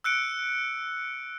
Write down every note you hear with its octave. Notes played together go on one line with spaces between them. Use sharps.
E6 F#6 C#7 D7